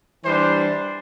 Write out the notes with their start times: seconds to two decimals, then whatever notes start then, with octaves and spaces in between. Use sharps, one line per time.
0.24 E3 G3 D4 C5